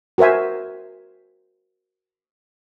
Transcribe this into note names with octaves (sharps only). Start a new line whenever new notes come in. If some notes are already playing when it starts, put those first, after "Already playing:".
F#4 A#4 C5 E5 G#5